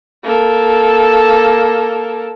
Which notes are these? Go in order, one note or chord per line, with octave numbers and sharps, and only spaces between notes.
A#3 A4